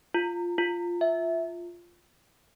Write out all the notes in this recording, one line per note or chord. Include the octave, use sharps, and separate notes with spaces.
F4
F4
E5